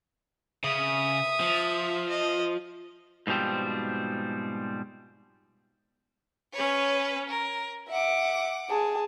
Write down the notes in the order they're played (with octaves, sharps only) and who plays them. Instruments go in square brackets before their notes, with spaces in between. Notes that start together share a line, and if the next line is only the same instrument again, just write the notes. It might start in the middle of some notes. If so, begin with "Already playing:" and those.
[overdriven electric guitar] C#3 [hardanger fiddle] E5 D#6
[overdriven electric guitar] F3
[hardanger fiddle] D#5
[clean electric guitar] G#2 B2 F3 G3 C4
[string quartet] C#4 B4 C#5
A#4
[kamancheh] E5 [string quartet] F#5 D6
[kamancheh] G#4 A5